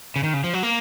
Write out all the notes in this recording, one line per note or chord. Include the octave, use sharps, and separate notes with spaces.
C#3
D#3
C#3
F3
F#3
A#3